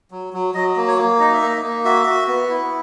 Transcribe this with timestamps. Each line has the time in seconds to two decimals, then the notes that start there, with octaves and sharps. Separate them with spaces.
0.11 F#3
0.33 F#3
0.55 F#3 D#5
0.77 A#3
0.87 C#5
0.98 A#3
1.20 D#4 D#5
1.33 E5
1.42 A#3 D#5
1.63 A#3
1.85 F#4 E5
2.06 F#4
2.28 B3
2.50 E4